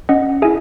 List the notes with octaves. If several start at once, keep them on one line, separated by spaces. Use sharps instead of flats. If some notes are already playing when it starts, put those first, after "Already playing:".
C#4 D#5 F#5
E4 G#4 E5 G#5